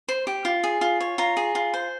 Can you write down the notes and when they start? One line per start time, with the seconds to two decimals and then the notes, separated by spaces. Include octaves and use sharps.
0.08 C5
0.27 G4
0.45 F4
0.64 G#4
0.81 F4
1.00 C#5
1.18 F4 A#5
1.37 G#4
1.55 F4
1.74 C5